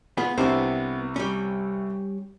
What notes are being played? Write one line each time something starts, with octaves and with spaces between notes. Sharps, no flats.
B3 F4 G#4
C2 C3 B3 D4 E4 C5
G3 C#4